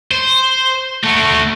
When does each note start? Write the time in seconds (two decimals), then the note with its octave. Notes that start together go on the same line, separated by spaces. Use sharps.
0.11 C5
1.03 A3 F#4